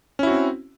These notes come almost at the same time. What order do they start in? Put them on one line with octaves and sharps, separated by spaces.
C#4 E4 F#4 C4